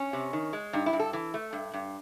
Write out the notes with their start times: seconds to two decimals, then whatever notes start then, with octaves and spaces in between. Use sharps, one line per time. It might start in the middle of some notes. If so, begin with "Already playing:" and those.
Already playing: C#4
0.13 C3
0.33 D#3
0.53 G#3
0.73 G2 D#4
0.86 E4
0.93 G2
0.99 A4
1.13 E3
1.34 A3
1.53 G2
1.73 G2